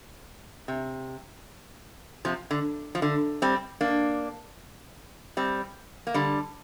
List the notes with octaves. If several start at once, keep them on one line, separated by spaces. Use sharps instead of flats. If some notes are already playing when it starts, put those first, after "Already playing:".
C3
C3 F3
D3
F3
D3
G3 C4
A#3 D4
G3 C4
A#3
D3 G3